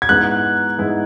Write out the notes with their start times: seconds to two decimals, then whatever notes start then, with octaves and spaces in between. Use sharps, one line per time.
0.02 G#6
0.09 G#2 G#3 B3 E4 F#6
0.79 G#2 G#3 B3 E4